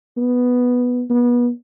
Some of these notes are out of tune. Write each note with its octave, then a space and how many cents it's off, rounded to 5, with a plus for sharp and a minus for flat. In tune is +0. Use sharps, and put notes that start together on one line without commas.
B3 +0
B3 -30